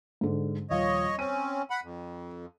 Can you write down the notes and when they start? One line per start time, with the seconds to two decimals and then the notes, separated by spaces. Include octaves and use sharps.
0.21 G#2 D3
0.70 D#1 F3 C#5 D#5 F5
1.19 C4 C#4 D#7
1.70 F#5 B5
1.83 F2